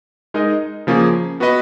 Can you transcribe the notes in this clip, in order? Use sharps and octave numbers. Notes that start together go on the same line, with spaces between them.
G#3 D#4 A#4 D#5
C#3 F3 A#3 C#4 G#4
B3 F#4 B4 D#5